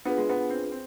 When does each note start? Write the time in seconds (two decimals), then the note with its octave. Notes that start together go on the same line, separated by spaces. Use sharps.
0.05 B3 D4 F4 G#4 B4
0.18 G#3
0.29 B3
0.50 C4
0.71 C4